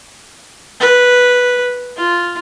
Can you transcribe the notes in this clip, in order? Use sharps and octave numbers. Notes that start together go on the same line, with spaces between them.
B4
F4